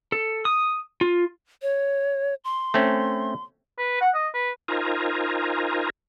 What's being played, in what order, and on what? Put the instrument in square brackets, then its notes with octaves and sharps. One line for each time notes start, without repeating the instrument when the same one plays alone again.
[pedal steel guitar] A4
D#6
F4
[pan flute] C#5
C6
[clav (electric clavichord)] A3 C4 C#4
[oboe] B4
F#5
D#5
B4
[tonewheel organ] D#4 F4 A#4 C5 G#5 A#5